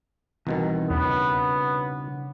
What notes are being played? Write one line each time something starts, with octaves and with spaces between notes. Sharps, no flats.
C2 B2 D#3 E3
E2 C#3 B3 D4 C#5